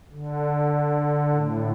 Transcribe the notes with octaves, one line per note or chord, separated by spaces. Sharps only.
D3
A2